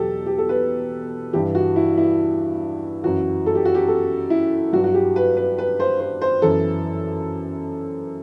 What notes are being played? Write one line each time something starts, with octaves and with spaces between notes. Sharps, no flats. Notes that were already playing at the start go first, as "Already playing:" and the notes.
Already playing: E2 B2 F#3 G4 A4
G4
A4
B4
G2 E3 G4
F#4
E4
E4
F#2 E3 F#4
A4
G4
F#4
G4
A4
E4
G2 F#3 F#4
F#4
G4
B4
B4
B4
C5
C5
C5
F#2 E3 A4